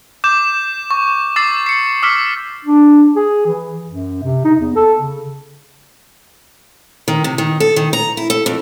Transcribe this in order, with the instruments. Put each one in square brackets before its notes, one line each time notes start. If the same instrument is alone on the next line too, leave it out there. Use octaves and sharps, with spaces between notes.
[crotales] D6 G6 E7
C#6
D6 E6 A6 C7
C7 C#7
D6 E6 F6 B6 C#7
[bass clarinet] D4
G#4
E3
F#2
C3
D#4
E2
A4
C#3
[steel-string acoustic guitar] D#3
C3
D#3
A4
D#3
A#5
E4
A4
F2